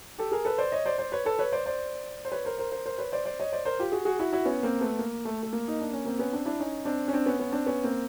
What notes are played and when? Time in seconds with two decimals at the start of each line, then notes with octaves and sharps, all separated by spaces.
0.18 G4 A4
0.32 G#4 A#4
0.45 A4 B4
0.58 C5 D5
0.72 C#5 D#5
0.86 C5 D5
0.98 C5 D5
1.12 B4 C#5
1.25 A4 B4
1.38 B4 C#5
1.52 C5 D5
1.66 C5 D5
2.25 C5
2.32 B4 C#5
2.45 A#4 C5
2.58 A#4 C5
2.72 A#4 C5
2.86 A#4 C5
2.98 B4 C#5
3.12 C5 D5
3.25 C5 D5
3.40 C#5 D#5
3.52 C5 D5
3.65 A#4 C5
3.79 F4 G4
3.92 F#4 G#4
4.05 F#4 G#4
4.19 E4 F#4
4.32 E4 F#4
4.45 B3 C#4
4.63 A#3 C4
4.81 A3 B3
4.99 A#3
5.25 A3
5.43 A3
5.53 A#3
5.68 D#4
5.81 D4
5.93 C#4
6.05 A#3 C4
6.19 B3 C#4
6.33 C4 D4
6.45 D4 E4
6.60 C#4 D#4
6.85 C4 D4
7.08 C#4
7.13 C4 D4
7.26 B3 C#4
7.39 B3 C#4
7.52 C4 D4
7.66 B3 C#4
7.84 A#3 C4